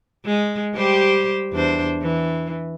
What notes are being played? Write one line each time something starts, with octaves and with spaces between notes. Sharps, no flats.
G#3
G3 G4 C5
E2 D4 C5
E3